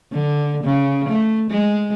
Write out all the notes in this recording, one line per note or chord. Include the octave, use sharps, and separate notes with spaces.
D3
C#3
A3
G#3